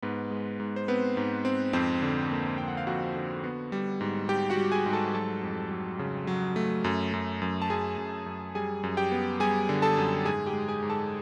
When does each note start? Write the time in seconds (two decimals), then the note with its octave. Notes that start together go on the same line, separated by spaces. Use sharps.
0.02 G#2 B3 B4
0.31 G#3
0.60 G#2
0.76 C5
0.88 B3 C4 B4
1.17 G#2
1.45 C4
1.73 F2 C4 C5
2.02 D3
2.31 A#3
2.58 F2 G5
2.68 F#5
2.77 F5
2.87 F2 F#4 F#5
3.15 D3
3.44 B3
3.72 G3
4.01 G#2
4.29 G3 G4 G5
4.50 F#4 F#5
4.57 G3
4.72 G#4 G#5
4.86 G#2
4.93 A4 A5
5.14 F#3 A4 A5
5.43 F2
5.71 F#3
5.99 C#3
6.27 F#3
6.56 A3
6.84 F#2
7.13 F#2
7.42 F#2
7.62 A5
7.70 F#2 G#4 G#5
7.98 F#2
8.26 F#2
8.55 G3 G#4 G#5
8.83 F#2
8.97 G4 G5
9.12 B3
9.40 G3 G#4 G#5
9.69 D3
9.82 A4 A5
9.97 F#2
10.25 G#2 G#4 G#5
10.46 G4 G5
10.53 G#3
10.69 G#4 G#5
10.83 G#2
10.90 A4 A5